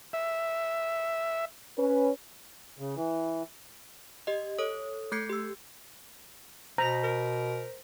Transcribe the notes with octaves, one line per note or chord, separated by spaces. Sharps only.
E5
C#4 B4
C#3
E3
G4 D#5
A4 C#5 D#6
A3 A4 G6 G#6 C7 C#7
G4 E6
B2 C5 A#5 A#6 B6
A#4